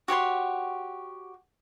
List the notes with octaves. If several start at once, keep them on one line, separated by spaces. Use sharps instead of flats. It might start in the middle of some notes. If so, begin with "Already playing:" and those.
F#4 G4 C#5 C6